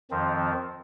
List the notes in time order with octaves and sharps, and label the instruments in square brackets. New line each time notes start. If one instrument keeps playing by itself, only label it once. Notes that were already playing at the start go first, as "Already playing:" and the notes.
[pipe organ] F2 D#3 F3 C4